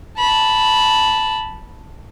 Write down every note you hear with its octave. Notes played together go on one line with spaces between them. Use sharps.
A5 B5